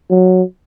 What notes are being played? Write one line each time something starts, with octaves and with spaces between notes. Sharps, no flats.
F#3